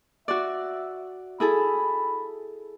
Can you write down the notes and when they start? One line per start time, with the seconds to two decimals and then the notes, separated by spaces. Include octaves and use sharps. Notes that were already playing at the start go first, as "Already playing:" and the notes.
0.28 F#4 D5 E5
1.40 E4 G#4 A4 B5